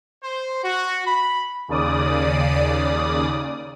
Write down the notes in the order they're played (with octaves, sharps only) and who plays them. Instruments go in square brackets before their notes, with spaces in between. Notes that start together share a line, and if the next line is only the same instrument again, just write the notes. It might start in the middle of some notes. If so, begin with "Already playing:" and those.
[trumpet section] C5
F#4
B5
[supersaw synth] D#2 C#3 D5 D#6